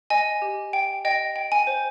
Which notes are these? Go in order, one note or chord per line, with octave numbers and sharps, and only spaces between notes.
D#5 G#5
G4
G5
D#5 G5
G5
G#5
C5